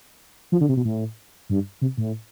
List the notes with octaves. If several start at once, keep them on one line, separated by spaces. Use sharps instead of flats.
F3
D3
C3
B2
A2
G2
C3
A2